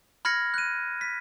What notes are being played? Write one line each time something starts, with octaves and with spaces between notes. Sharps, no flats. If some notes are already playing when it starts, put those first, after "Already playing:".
B5 F6 G#6 A#6 C#7
F#6 D#7
B6